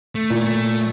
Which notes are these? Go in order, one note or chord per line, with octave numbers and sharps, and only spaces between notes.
A3
A#2
A3